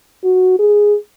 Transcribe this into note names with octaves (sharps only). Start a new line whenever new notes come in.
F#4
G#4